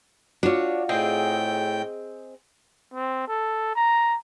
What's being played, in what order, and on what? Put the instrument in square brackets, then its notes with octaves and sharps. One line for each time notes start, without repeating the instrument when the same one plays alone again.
[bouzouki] D4 C#5 [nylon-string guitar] F4 F#4
[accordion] A2 G5 [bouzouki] C4 G#4 D#5
[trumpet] C4
A4
A#5